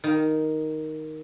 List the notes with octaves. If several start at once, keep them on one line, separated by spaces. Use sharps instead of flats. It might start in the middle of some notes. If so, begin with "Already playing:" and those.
D#3